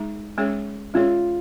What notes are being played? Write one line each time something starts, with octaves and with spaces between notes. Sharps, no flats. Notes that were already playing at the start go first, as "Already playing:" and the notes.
Already playing: G#3 D#4 G#4
G#3 C#4 G#4 C#5
G#3 C#4 F4 G#4 C#5